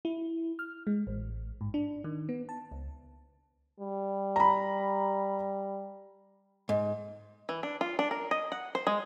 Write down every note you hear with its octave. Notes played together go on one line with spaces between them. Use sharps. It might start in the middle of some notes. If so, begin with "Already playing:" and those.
E4
F6
G#3
A1
G#2
D4
D#3
B3
A5
C#2
G3
A#5 B5
G#2
E3
D4
F4
D4
A#4
D#5
F#5
C5
G#3